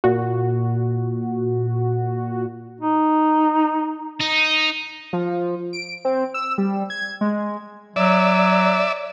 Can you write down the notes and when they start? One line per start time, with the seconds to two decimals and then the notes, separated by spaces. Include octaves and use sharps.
0.04 A#2 F#4
2.81 D#4
4.20 D#4
5.13 F3
5.73 D7
6.05 C4
6.34 E6
6.58 G3
6.90 G#6
7.21 G#3
7.96 F#3 D5 E5